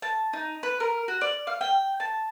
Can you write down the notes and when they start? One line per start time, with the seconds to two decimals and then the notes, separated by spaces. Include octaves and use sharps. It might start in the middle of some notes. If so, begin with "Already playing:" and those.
0.02 A5
0.33 D#4
0.63 B4
0.80 A#4
1.08 F#4
1.21 D5
1.47 F5
1.61 G5
2.00 A5